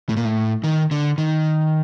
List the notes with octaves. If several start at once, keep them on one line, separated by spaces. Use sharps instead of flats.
A2
A#2
A2
D#3
D3
D#3